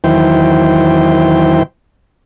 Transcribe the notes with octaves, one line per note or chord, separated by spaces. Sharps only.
E2 D#3 F#3 E4 C5 G5